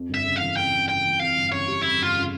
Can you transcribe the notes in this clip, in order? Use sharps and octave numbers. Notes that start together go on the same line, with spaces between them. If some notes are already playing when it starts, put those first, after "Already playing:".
Already playing: F2
G1
E5
C#3
F5
E3
F2 G5
G1
C#3 G5
E3
F2 F5
G1
C#3 C#5
G3
F2 E4
G1 F4
C#3